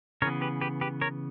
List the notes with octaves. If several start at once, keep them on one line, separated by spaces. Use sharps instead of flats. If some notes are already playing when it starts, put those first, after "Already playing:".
C#3 E3 B3 A#4 C#5
G4 B4
G4 B4
G4 B4
A#4 C#5